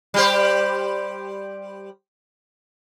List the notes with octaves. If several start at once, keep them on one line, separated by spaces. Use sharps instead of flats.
G3 G4 C5